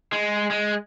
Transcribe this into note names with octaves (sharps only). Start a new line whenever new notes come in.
G#3
G#3